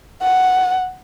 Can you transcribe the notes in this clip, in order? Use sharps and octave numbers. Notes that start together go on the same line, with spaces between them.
F#5